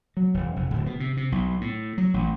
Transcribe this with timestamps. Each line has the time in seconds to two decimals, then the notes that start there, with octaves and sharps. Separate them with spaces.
0.17 F#3
0.34 E1
0.56 F1
0.71 D1
0.86 B2
1.00 C3
1.17 C3
1.32 B1
1.61 A2
1.98 F#3
2.14 A1